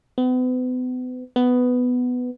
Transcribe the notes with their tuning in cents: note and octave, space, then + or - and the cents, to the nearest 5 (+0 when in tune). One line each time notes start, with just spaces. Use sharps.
B3 +40
B3 +10